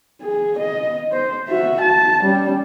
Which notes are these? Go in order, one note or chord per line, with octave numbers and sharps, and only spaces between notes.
G#4
D#5
C5
F#4 E5
A5
G3 C#4